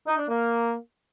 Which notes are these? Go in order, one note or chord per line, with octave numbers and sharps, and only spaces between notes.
D#4
D4
A#3